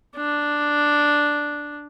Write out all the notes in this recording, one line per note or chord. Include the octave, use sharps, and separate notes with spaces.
D4